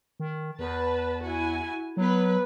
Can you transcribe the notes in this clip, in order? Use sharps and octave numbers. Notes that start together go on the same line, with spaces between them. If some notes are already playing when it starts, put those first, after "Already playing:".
D#3
E2 B4 A5
E4 F#4 G#5
F#3 B3 B4